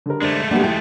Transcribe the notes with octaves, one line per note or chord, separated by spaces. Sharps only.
D3 G3 A#4
G#3 A3 D4 C5
G3 A#3 B3 D4 F#4 G4 B4 F#5
E3 G4 G5